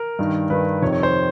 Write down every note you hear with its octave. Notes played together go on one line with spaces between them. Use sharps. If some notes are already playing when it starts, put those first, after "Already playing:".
Already playing: A#4
G2 D#3
G2 D#3 B4
F2 C3 D#3 C#5
C#5
C5